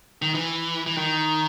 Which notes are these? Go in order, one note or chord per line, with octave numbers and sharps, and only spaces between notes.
D#3
E3
E3
D#3